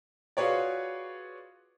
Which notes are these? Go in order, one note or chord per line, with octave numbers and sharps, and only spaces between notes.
F4 F#4 G#4 B4 C#5 D5